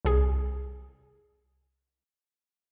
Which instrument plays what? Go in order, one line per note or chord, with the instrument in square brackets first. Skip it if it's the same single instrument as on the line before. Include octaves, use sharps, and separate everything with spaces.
[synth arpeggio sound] C2 G#4